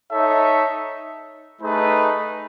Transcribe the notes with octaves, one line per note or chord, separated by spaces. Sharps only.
D#4 A4 C#5 E5
A3 D#4 G#4 B4